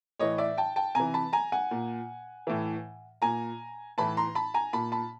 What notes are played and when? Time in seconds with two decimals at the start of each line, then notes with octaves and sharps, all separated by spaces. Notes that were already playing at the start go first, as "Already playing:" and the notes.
0.19 A2 E3 C#5 D#5
0.38 D5 E5
0.58 G5 A5
0.76 G5 A5
0.95 C3 E3 G#5 A#5
1.14 A5 B5
1.33 G#5 A#5
1.52 F#5 G#5
1.71 A#2
2.47 A2 E3
3.22 A#2 G#5 A#5
3.98 A2 E3 A5 B5
4.17 A#5 C6
4.35 A5 B5
4.54 G#5 A#5
4.73 A#2 A5 B5
4.92 A5 B5